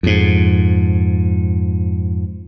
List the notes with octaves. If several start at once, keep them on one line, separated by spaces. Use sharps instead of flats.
F2 G#2